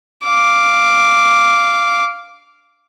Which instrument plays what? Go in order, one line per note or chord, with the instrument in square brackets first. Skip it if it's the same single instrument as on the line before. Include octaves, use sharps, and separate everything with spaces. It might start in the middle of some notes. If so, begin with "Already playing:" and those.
[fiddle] F5 D6